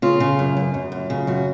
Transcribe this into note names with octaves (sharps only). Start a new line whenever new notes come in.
C#3 F4
C#3
F#2
F#2
F#2
F#2
C#3
F#2 F#4